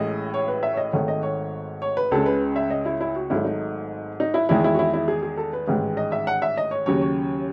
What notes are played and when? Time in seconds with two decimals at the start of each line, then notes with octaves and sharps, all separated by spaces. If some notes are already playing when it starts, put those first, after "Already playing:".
Already playing: A1 A2 G#3 D#5
0.34 C#5
0.48 B4
0.63 E5
0.73 C#5
0.77 D#5
0.92 G#1 G#2 D#3 A3 C#5
1.08 D#5
1.23 C#5
1.82 C#5
1.97 B4
2.11 C#2 C#3 G#3 A4
2.26 B4
2.56 E5
2.70 D#5
2.85 E4
3.01 E4
3.16 F#4
3.30 G#1 G#2 F#3 A3 E4
3.45 D#4
4.20 D#4
4.34 E4
4.49 E2 D#3 G#3 E4
4.64 E4
4.74 F#4
4.79 E4
4.94 E4
5.08 G#4
5.23 G#4
5.37 A4
5.53 B4
5.67 A1 G#2 D#3 G#3
5.97 D#5
6.12 E5
6.27 F#5
6.42 E5
6.57 D#5
6.71 C#5
6.86 D#2 C#3 F#3 C#5
7.01 C#5